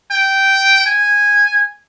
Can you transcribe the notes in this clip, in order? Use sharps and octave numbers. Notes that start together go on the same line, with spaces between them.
G5
G#5